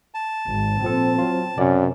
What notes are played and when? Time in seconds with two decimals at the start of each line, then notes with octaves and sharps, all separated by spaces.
0.14 A5
0.47 G#1
0.82 A#2 F3 C4 A4
1.18 F#3 F4
1.58 F#2 C3 C#4 F#4 D5